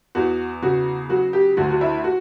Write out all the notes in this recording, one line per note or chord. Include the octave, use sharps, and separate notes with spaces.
E2 F#4
C#3 F#4
F#3 F#4
G4
D2 F#4
F#4
E4
F#4